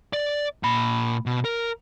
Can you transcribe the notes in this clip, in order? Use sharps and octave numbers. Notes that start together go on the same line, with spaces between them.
D5
A#2 B5
B2
A#4